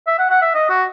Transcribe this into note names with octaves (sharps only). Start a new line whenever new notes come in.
E5
F#5
F#5
E5
D#5
F#4